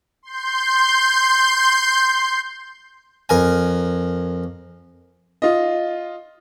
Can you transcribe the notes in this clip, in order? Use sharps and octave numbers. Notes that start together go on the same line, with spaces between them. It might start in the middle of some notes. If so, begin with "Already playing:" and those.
C6 G6
F2 A#4 G#5
F4 D#5